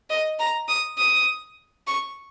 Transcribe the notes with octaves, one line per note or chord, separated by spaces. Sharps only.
D#5
A#5
D#6
D#6
C#6